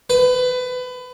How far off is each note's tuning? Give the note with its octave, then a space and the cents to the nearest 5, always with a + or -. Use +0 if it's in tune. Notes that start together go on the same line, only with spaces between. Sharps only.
B4 +25